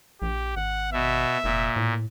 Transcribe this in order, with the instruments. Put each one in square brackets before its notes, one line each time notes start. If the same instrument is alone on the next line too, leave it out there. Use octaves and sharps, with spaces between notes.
[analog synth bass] A#1 [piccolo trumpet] G4
[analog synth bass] G#1 [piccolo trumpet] F#5
[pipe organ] B2 [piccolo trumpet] E5
[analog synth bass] F1 [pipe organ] A#2
[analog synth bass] A2